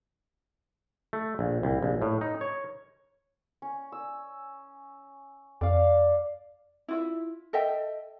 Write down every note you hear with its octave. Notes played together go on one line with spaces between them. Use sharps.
A3
A#1
C2
A#1
A2
D#4
C#5
C#4
E6
F2 D5 F5
E4 F4 E5
A4 D#5 E5 G5